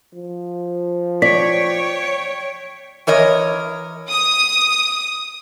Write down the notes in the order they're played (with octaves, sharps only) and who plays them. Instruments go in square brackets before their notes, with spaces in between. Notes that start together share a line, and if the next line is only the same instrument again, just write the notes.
[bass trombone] F3
[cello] C#5 G5 [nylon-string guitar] D5 [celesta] B6
[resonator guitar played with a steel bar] E3 A#4 C#5 D#5
[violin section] D#6